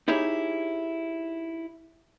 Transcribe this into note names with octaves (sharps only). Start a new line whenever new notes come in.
D#4 E4 G4 G#4 C#5